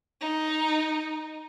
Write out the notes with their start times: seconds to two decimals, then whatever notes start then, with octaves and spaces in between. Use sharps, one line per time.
0.21 D#4